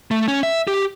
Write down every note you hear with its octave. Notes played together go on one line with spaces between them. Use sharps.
A3
C#4
E5
G4